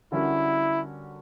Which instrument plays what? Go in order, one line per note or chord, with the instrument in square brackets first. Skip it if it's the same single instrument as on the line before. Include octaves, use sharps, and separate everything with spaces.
[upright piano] D3 G3 C#4 F#4 A#4 [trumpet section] E4